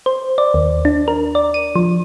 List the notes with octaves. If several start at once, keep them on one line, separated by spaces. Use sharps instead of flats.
C5
D5
D#2
D4
A#4
D5
D#7
F3